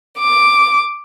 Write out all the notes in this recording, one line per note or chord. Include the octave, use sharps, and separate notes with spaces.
D6